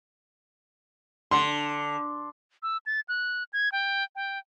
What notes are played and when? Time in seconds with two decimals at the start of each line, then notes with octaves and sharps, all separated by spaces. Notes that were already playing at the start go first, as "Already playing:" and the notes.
1.31 D3 C6
2.63 E6
2.86 A6
3.09 F#6
3.53 G#6
3.72 G5
4.15 G5